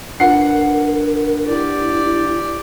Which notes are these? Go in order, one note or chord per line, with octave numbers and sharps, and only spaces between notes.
D4 F4 A#4 B4 F#5 C7
E4 G4 D5